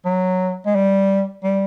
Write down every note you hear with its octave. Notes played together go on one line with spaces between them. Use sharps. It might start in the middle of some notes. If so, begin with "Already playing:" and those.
F#3
G#3
G3
G3